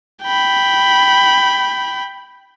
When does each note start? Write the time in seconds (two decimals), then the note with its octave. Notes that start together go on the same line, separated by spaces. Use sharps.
0.23 G5 B5